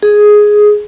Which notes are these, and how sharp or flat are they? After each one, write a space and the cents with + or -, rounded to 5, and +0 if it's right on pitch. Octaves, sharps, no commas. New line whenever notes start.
G#4 +5